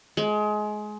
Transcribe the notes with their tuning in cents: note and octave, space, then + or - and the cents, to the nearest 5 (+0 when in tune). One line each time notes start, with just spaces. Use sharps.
G#3 +25